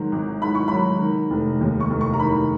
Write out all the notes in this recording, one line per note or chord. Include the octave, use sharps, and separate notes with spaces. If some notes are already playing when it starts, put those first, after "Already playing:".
Already playing: G#2 D#3 F#3
G#1
G#2 B5
C#6
F#3 B5
D#3
F1
D#2
C#6
F1
C#6
A#5
D#3 B5